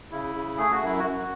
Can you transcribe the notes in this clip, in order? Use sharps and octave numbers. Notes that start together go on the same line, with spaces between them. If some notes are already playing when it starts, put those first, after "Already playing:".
C#3 E4
C#3
A3 G#4
F#4
F#2 E4
F#4
F#2